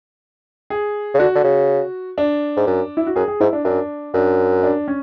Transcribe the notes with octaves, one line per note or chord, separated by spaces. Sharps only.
G#4
C#3
D3 F#4
D3
C#3
D4
G#2
F#2
E4
F#4
F#2 G#4
G#4
G#2 E4
D4
F#2 D4
F#2 D4
D4
C#4